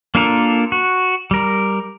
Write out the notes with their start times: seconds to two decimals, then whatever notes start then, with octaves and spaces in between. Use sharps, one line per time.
0.15 A#3 D4 F4 A4 A#4
0.72 F#4
1.31 G3 A#4